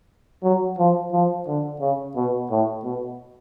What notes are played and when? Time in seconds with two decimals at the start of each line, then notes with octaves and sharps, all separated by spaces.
0.43 F#3
0.78 F3
1.12 F3
1.47 D3
1.80 C#3
2.16 B2
2.50 A2
2.84 B2